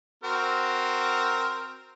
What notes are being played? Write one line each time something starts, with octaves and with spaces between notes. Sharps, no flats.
C4 F#4 A#4